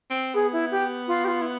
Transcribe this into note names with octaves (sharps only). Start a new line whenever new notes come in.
C4
B3 G#4
E4
G4
F4
G4
F4
E4